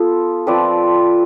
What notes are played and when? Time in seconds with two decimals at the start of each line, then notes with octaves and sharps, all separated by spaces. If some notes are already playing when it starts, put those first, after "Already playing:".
Already playing: B3 F4 A4
0.47 F3 A3 C4 F4 B4 D5